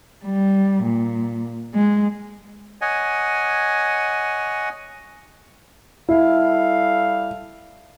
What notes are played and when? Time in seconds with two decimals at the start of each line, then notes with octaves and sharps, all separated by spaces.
0.25 G3
0.83 A#2
1.74 G#3
2.81 C#5 D#5 F#5 G#5
6.09 G3 E4 A4 F5